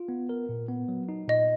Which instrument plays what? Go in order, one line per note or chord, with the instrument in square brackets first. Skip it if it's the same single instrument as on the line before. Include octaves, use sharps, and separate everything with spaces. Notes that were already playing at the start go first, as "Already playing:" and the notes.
Already playing: [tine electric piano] F4
B3
A#4
A#2
B3
F#3
D#4
[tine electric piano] A#2 [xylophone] D#5